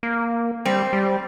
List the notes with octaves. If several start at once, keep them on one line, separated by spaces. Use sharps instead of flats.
A#3
G3 C4
G3